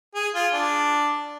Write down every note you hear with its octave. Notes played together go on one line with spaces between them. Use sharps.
G#4
F4
D4